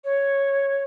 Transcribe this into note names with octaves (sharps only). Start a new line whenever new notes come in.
C#5